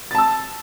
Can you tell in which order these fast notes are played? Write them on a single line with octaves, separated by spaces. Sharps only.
A6 A5 E6